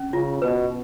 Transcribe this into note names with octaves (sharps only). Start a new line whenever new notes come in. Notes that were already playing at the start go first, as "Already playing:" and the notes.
Already playing: C#4
C#3 F4
B2 B4